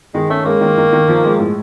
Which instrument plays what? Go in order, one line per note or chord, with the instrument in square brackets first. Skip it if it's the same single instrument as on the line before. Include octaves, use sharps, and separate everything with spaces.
[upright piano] D#3 [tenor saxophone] G#3
[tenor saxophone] A3 [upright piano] C#4
[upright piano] G#3 [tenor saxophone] A#3
[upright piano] D#3
D#3
D#3
F3
G#3
A2